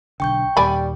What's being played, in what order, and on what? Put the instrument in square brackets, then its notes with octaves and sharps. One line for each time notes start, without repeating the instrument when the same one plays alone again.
[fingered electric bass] B1 D3 [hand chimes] G5 C#6 G6
[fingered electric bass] D#2 A#2 [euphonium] G3 [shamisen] D5 G#5 B5